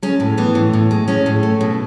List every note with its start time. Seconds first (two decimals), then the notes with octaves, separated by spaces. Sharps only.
0.03 G#3 C#4
0.20 A2
0.37 E3 B3
0.55 A2
0.73 A2
0.91 G#3
1.08 G#3 C#4
1.26 A2
1.43 A3
1.61 B2